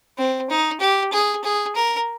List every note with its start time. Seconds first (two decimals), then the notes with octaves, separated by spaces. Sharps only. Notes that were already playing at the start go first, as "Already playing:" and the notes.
0.18 C4
0.49 D#4
0.81 G4
1.12 G#4
1.44 G#4
1.76 A#4